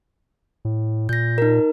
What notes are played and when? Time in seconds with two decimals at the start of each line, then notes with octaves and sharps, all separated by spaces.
0.65 A2
1.09 A#2 G6 A#6
1.38 D#4 A#4